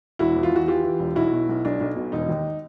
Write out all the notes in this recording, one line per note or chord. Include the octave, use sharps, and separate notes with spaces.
E1 E4 F#4
E2
F4
E2 F#4
E3 F4 G4
E3
E1
B1 E4 F#4
B2
B1
B1 D4
B1
B2
E1 D#4
D#2